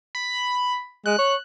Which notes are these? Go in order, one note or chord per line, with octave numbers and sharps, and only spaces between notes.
B5
G#3 F#6
C#5